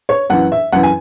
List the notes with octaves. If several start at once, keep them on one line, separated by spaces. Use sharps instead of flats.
C#5
F#2 E3 F#5
E5
F#2 E3 F#5
G#5